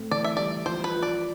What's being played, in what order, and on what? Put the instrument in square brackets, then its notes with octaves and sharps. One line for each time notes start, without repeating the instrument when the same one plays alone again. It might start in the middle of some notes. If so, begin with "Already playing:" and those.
Already playing: [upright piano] A2 C4
[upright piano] E3 [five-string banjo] D5
[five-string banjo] E5
[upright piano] G3 [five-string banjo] D5
[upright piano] F3 [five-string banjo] C5
[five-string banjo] B4
[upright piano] F4
[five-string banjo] D5